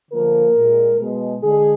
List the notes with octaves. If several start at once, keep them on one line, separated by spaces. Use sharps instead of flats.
D3 F3 A#3 A#4
A#2 G#3
B2 G#3
D3 G#3 G#4